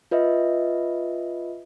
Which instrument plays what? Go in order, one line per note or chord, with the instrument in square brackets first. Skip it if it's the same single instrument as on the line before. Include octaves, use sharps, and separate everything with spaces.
[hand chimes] F4 B4 D#5 E5